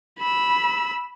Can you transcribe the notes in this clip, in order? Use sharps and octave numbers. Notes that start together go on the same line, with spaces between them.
B5 E6